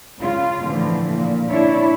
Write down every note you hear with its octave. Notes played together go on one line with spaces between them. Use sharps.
C#3 F4
A2 D3 E3 F3
A#2
D4 E4 C#5